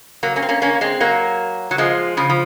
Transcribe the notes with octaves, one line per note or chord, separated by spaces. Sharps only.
F#3 A#3
A#3 C#4
C4
A#3 C#4
A#3 C#4
G#3 C4
F#3 A#3
F#3
F3 G#3
C#3 F3
F3